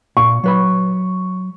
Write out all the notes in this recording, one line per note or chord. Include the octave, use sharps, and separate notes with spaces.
A#2 C#6
F#3 B4 B5